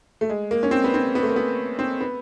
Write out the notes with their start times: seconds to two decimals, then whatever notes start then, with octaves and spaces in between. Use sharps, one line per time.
0.21 A3
0.29 G#3
0.51 A#3
0.63 C#4
0.71 C4
0.84 B3
0.94 C4
1.15 B3
1.23 A3
1.29 A#3
1.36 B3
1.79 C4
2.00 B3